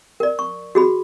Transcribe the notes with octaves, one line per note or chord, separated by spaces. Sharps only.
A#4 D5
C#6
F#4 G#4 B5